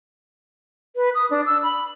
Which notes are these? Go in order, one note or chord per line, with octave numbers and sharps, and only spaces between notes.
B4
D#6
D4
E6
B5